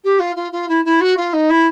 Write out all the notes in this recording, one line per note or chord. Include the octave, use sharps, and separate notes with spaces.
G4
F4
F4
F4
E4
E4
F#4
F4
D#4
E4